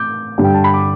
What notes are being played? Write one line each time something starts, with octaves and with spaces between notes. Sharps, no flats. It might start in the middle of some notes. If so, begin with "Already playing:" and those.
Already playing: A2 D6 G6
G2 D3 G3
G5
A5
B5
D6